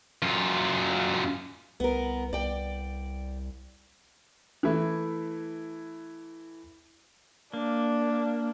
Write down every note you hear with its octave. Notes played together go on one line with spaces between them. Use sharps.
F#2 F4
C2 B3 A#4
C2 D5 G5
E3 A3 E4
A#3 D4